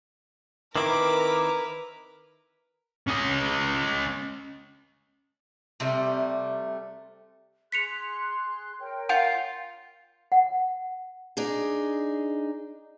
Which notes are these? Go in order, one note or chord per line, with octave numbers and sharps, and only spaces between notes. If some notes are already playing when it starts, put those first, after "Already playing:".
D#3 C4 E4 A#4 B4 D6
C#4 D#5
C3 G3 A3
G#4 C6 F#6 B6 C#7 F7
A#4 C#5 G5
F4 F5 F#5 G6 F7
F#5
D4 D#4 G#4